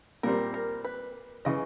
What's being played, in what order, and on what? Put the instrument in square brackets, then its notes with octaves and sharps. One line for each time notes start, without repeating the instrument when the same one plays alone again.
[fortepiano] A#2 G3 C4 [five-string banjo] A#4
[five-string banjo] A#4
B4
[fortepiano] C#3 E3 [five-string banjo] D#5